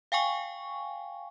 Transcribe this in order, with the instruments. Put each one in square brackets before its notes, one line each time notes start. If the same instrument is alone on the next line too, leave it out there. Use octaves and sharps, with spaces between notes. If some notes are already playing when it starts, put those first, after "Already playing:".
[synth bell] F5 G5 G#5 C#6